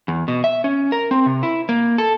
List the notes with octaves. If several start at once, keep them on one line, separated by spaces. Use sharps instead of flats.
E2
B2
E5
C#4
A#4
C4
C3
E4
A#3
A4